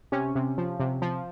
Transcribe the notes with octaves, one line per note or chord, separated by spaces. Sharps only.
C3 C#4
C3
F3
C3
F3